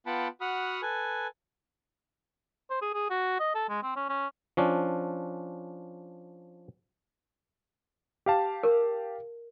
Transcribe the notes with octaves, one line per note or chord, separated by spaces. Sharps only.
B3 F4 F#5 G5 A5 B5
F#4 F#5 B5 D#6 F6
A4 B4 G#5
C5
G#4
G#4
F#4
D#5
A4
G#3
C4
C#4
C#4
F3 C#4 D4
G4 F5 A5
A#4